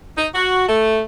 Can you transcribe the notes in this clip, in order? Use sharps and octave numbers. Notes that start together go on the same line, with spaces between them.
D#4
F#4
A3